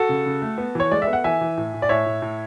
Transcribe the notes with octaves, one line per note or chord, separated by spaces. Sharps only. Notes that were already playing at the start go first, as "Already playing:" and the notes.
Already playing: F#4 A4
C#3
C#3
A3
B3
E3 C#5
G#3 D5
E5
B3
F#5
E3 E5 G#5
E3
A2
A2
D5
A2 C#5 E5
A2
A2